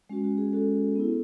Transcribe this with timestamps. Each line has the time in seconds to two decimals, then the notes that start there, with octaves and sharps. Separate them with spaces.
0.10 G#3 C#4 F#4
0.24 F#4
0.38 G#4
0.53 G#3 C#4 F#4 A4
0.95 B3 E4